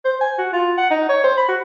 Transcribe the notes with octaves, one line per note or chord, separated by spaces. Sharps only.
C5
G#5
F#4
F4
F#5
D#4
C#5
C5
B5
F#4